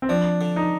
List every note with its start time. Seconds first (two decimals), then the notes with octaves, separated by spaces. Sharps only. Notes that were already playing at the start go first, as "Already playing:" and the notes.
0.02 C4
0.09 F3 D4
0.41 D3
0.56 D#4